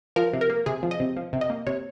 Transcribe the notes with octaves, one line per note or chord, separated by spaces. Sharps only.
F3 A#4
C3
A#4
A#3
C3 G#4
F3
D#5
C3
F3
C3
D#5
A#3
C3 C#5